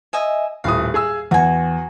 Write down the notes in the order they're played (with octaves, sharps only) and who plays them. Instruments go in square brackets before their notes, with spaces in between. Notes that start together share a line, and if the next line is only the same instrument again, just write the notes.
[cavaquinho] D#5 E5 G#5
[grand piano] D#1 A2 D#6 [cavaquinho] F5
[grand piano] G#4 G#5 E6
[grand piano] E2 [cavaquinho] F#4 G#5